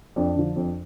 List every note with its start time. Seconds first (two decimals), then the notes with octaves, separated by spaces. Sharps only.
0.16 F2 D4 D5
0.36 D3 F3
0.56 F2